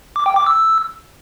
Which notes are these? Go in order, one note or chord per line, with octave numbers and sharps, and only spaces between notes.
D6
G5
D6
E6